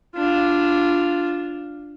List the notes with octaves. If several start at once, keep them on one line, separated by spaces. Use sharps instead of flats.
D4 F4